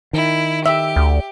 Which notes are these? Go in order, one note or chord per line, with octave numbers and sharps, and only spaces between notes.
D#3 E4
G4 E5
D2